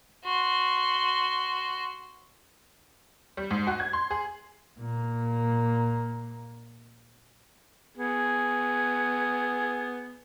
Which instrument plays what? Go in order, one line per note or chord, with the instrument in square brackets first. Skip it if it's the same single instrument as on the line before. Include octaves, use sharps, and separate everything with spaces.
[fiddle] F#4 C6
[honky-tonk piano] G3
G#2
F#4
G#6
C6
G#4
[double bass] A#2 A#3
[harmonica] B3 G#4